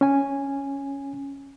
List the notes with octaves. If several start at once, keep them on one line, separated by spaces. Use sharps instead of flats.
C#4 G#5